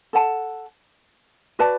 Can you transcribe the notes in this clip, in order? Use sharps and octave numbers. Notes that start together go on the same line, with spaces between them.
A4 F#5 A5
F#4 B4 D5 A5